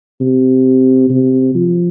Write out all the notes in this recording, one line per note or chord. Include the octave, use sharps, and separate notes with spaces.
C3
C3
F3